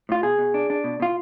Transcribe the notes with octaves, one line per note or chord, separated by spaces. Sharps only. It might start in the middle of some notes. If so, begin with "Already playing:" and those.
A2 F4
B2 G#4
B2
D4
D4
B2
B2 F4